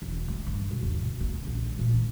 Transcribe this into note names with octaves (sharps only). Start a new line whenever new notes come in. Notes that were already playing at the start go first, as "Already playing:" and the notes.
E1
A3
G2
B2
D#2
B2
A#3
C#4
A#1
G#3
A#2
D#3